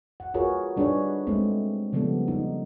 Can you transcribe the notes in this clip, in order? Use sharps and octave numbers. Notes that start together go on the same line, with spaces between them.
F#5
F4 F#4 G#4 A#4 B4 C#5
G3 D4 D#4 G#4 B4 C#5
G#3 A3 C4
C#3 F3 G3 B3 A4
D#4